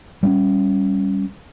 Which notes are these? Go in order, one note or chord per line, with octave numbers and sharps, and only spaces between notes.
G3 C4 C#4